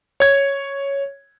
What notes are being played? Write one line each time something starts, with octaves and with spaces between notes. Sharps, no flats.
C#5 G#6